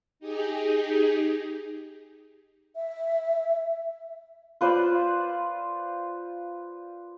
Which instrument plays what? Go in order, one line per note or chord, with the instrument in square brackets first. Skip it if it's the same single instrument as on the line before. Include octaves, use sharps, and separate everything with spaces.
[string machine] D#4 G4 G#4
[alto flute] E5
[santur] F4 B4 C5 D5